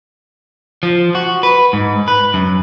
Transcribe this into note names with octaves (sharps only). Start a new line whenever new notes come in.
F3
F#4
B4
G#2
B4
F#2